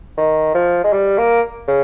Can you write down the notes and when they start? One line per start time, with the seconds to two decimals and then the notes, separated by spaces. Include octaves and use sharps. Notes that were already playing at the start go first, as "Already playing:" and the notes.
0.18 D#3
0.55 F3
0.84 G#3
0.93 G3
1.18 A#3
1.68 C#3